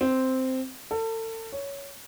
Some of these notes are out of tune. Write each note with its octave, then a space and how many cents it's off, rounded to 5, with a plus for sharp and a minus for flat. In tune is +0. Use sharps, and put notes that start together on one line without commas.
C4 -5
A4 +35
C#5 +10